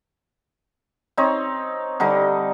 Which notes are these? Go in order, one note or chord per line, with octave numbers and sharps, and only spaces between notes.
C4 D#4 C#5
D3 G3 D#4